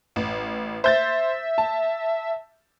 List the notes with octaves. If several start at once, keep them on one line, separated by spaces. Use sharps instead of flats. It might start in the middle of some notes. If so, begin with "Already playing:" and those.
A1
C5 E5 G6 A6
A5